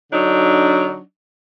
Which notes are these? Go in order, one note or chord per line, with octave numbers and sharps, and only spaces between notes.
D3 F#3 D4 D#4